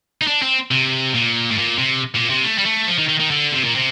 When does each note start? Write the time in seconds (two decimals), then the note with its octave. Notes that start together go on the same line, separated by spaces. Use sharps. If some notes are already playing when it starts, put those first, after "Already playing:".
0.21 D#4
0.27 D4
0.42 C4
0.71 C3
1.14 A#2
1.51 A2
1.58 A#2
1.79 C3
2.16 A#2
2.30 C3
2.44 A3
2.59 G3
2.66 A3
2.87 F3
2.99 D#3
3.09 D#3
3.20 D#3
3.31 D3
3.52 C3
3.64 A#2
3.75 C3